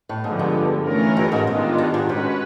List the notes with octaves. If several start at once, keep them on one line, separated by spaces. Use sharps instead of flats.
A2
G#2 D3 F3 G#3 B3
G2
E3 A3 C#4 F4 A#4
G2
G#2
G#2 D#3 G#3 B3 D4 F4
G2
G#2
G#2 G#3 C#4 F#4 B4